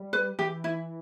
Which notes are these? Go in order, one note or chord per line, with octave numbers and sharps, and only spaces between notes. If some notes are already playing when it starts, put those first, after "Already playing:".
Already playing: G3
B4
E3 G4
E4